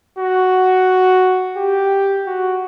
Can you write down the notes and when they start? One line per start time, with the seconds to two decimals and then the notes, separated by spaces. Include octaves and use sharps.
0.19 F#4
1.57 G4
2.26 F#4